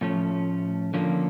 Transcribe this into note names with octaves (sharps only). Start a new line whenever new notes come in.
A2 F3 A3 C#4
D3 F3 A#3 C#4